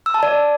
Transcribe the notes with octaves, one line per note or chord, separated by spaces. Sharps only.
E6
A5
D5